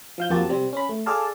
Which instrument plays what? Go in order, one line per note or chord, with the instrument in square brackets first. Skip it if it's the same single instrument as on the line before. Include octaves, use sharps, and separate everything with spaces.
[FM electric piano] F3 F5 G6
F2 F3 A#3 F#4 G4 A5
C3 G3 C4
C#4 B5
A3
G#4 A4 D5 F5 A5